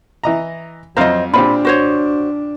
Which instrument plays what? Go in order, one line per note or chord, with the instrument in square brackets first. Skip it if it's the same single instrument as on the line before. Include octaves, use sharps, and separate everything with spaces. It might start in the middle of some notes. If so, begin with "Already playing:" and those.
[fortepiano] E3 D#5 A#5
[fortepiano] F2 F5 A#5 [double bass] F#3 [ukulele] C5 D#5
[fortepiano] A#2 C4 G4 [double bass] D4 [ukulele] B5
[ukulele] F#4 C5 C#5